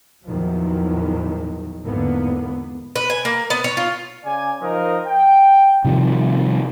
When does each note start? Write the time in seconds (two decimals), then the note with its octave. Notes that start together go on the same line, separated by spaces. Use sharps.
0.24 A#1 E2 D#3 F3 F#3
1.84 G#1 E2 D3 A#3 B3
2.96 B4
3.10 G#5
3.25 A#3
3.50 B3
3.64 C#5
3.77 F4
4.24 C#3 D5 G#5
4.61 F3 D#4 A#4 C5 D#5
5.05 G5
5.85 C3 D#3 F3 G3